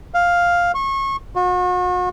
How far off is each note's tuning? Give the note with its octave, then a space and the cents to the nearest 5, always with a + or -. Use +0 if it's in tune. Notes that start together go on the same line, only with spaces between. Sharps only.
F5 +5
C#6 -30
F#4 -40